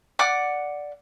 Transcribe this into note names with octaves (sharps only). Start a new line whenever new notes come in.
D5 F#5 D6